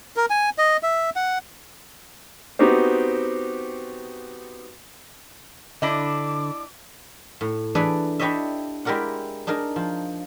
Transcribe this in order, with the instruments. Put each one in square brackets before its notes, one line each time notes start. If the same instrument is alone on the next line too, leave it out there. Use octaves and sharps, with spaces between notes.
[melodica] A#4
G#5
D#5
E5
F#5
[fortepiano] B3 C4 D#4 F#4 G4 C5
[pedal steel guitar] D3 [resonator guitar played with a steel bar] D4 E4 D#5 [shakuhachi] D6
[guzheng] A2
E3 D4 G#4 A4 B4 D5
D4 E4 G4 C#5 D#5 E5
G#3 E4 G4 A#4 D5 F#5
D4 D#4 G#4 A#4
F3